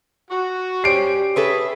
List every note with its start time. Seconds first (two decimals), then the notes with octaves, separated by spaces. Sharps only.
0.30 F#4
0.84 G3 C#4 G4 C5 C7 D7
1.36 G#4 A4 B4 C#5 E5